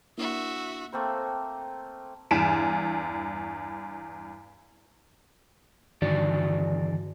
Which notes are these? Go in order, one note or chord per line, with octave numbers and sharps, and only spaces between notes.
A#3 D4 E4 F#4 E5
A3 A#3 C4 C6
E2 G2 G#5 B6 D7 E7
E2 G2 D3 D#3 F#4 D5